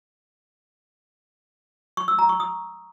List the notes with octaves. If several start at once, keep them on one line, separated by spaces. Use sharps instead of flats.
C#6
E6
A#5
C#6
D#6